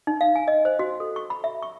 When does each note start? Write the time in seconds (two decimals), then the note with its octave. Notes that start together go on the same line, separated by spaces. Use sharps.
0.07 D#4
0.21 F5
0.35 G#5
0.48 D#5
0.65 C5
0.79 F#4
1.00 A4
1.16 C#6
1.30 B5
1.44 E5
1.63 C#6